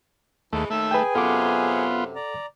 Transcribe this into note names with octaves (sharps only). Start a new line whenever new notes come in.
D#2 E3 G#3 A3
D#2 A3 E5
G#4 B4 G5 G#5
F#2 C3 B3 F4 A4 F#5 D6
D5 A#5